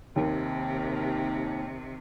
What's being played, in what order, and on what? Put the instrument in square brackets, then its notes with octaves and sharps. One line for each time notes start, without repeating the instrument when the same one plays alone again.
[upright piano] D#2 [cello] C3 D#3